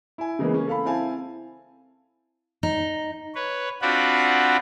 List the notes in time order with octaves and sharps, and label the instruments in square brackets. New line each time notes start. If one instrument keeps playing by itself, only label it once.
[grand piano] E4 G#5
C#3 E3 G#3 A#3 B3
A#3 C#4
A4 F5 B5
C4 E4 F5 G#5 A5
[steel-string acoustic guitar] D#4
[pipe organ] B4 C#5
C4 D4 F4 F#4 F#5 B5